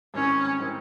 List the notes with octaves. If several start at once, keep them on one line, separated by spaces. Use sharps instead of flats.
G#2 D#3 G3 C4 C#4 D#4
D#3 G3 C4 D#4